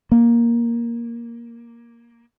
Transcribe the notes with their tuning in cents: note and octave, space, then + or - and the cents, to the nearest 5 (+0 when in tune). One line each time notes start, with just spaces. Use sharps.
A#3 +10